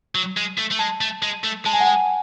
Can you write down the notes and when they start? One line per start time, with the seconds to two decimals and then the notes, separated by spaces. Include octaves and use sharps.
0.15 F#3
0.37 G#3
0.58 A3
0.71 A3
0.79 G#3 A5
1.01 A3
1.23 G#3
1.44 A3
1.66 G#3 A5
1.73 G#5
1.80 F#5
1.87 G#5